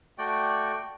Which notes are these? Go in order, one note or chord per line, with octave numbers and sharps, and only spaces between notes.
A3 F#4 D5 G5